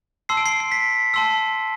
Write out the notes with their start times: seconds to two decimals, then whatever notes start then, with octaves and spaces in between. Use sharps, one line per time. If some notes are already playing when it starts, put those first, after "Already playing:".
0.29 A5 C6 E6 C7
0.37 D7
0.46 C7
0.60 C7
0.72 B6
1.14 A5 C6 E6